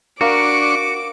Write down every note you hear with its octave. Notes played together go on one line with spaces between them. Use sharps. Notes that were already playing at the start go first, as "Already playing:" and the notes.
D4 F#4 A#4 F5 C#6 D6